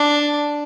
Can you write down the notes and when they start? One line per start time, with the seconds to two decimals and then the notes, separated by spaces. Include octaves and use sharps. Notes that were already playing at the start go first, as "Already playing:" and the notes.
Already playing: D4